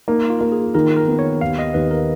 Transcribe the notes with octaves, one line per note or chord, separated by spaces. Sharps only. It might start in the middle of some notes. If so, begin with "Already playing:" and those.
A#3 D#4
F4
A#3
G#4
D#3 A#4
A#4
B3
C#5
D#2 F5
D#5
D#2 B4
A#4